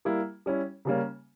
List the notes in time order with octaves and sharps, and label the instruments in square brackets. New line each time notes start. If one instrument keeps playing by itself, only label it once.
[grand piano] G3 A#3 E4
G3 C#4 E4
C#3 G3 A#3 C#4